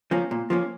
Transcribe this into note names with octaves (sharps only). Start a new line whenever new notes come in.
F3 A#3 C#4
A#2
F3 A#3 C#4